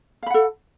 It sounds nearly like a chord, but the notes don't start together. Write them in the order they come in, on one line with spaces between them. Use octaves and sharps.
F5 B5 F#5 A4